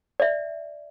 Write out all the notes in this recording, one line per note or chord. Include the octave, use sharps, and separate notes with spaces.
D5 E5